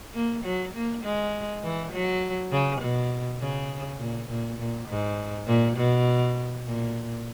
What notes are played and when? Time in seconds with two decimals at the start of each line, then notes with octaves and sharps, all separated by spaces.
0.14 A#3
0.44 F#3
0.74 A#3
1.04 G#3
1.63 E3
1.92 F#3
2.52 C#3
2.81 B2
3.40 C#3
3.99 A#2
4.28 A#2
4.59 A#2
4.88 G#2
5.47 A#2
5.76 B2
6.66 A#2